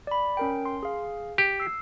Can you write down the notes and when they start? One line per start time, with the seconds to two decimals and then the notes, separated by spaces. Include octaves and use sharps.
0.07 D5 B5
0.37 C#4 A#4 G5
0.65 C6
0.83 G#4 F5
1.38 G4
1.60 E6 C7